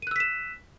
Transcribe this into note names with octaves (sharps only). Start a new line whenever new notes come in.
E6 F#6 B6 D#7 E7